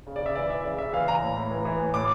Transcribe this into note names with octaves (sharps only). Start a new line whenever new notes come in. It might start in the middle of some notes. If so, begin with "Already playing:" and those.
C#3
D5
C#3 E5
E3 D5
E3 E5
C#3 D5
C#3 E5
E3 F5
E3 A#5
A2
A2
E3
E3
A2
A2 D6